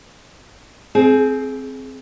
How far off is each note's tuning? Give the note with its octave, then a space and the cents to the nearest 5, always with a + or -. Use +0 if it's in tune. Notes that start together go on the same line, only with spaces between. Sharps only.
C4 +0 G#4 +25